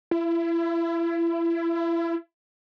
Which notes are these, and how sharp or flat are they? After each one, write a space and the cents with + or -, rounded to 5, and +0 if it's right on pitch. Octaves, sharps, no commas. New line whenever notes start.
E4 +30